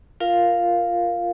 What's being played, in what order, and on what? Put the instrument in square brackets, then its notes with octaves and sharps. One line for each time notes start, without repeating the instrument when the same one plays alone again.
[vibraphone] F4 A#4 F5